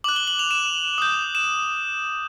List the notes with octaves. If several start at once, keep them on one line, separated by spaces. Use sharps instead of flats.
D6 F#6 F#7
G7
F#7
F7
E7
D#6 G6
E7